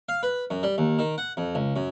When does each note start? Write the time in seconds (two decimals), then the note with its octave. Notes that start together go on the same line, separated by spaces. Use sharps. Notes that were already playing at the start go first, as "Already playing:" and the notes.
0.09 F5
0.23 B4
0.50 F#2
0.63 G3
0.78 D#2
0.99 D#3
1.18 F#5
1.37 F2
1.55 C#2
1.76 F#2